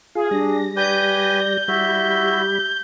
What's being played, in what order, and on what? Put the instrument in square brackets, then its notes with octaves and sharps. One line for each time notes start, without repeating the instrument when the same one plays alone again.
[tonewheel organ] F4 F5 [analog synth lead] G#4
[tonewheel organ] G3 A#6 [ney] D4
[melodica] G4 B4 G#5 [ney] D5 [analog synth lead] G6
[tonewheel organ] G3 B5 [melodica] E4 F#4 E5 [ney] G4